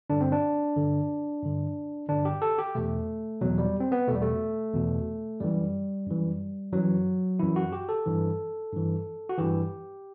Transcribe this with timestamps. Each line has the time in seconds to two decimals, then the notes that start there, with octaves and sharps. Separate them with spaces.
0.10 G2 D3 D4
0.21 C4
0.32 D4
0.76 G2 D3
1.43 G2 D3
2.09 G2 D3 D4
2.25 G4
2.42 A4
2.58 G4
2.75 E2 B2 A3
3.41 E2 B2 F#3
3.58 G3
3.80 C4
3.92 B3
4.08 B2 A3
4.12 E2 G3
4.22 A3
4.74 E2 B2
5.40 F#2 E3 G3
6.07 F#2 E3
6.73 F#2 E3 F#3
7.39 F#2 E3 E4
7.56 F#4
7.72 G4
7.89 A4
8.06 G2 E3
8.72 G2 E3
9.29 F#4
9.38 G2 E3 G4